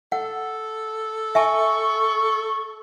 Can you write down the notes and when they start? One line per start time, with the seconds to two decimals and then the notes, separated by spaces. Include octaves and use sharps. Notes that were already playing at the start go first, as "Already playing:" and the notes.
0.12 A4 F#5
1.35 E5 G#5 A5 C#6